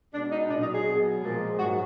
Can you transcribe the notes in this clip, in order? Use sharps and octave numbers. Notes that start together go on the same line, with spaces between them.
B2 G#3 D4
D#4
A#2 F#3 D4
D#4
G#4
B2 F#3
A#2 F3 G#3
G#2 F#3 F#4